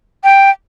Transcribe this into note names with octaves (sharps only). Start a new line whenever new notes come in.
G5